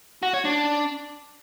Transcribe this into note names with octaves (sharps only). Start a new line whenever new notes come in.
F#4
C#5
D4